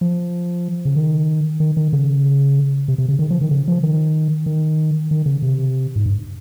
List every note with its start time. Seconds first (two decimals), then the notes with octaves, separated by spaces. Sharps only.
0.01 F3
0.85 C#3
0.96 D#3
1.60 D#3
1.77 D#3
1.93 C#3
2.88 C3
2.98 C3
3.08 C#3
3.19 D#3
3.31 F3
3.41 D#3
3.51 C#3
3.68 F3
3.83 D#3
4.46 D#3
5.11 D#3
5.26 C#3
5.42 C3
5.96 G#2
6.06 G2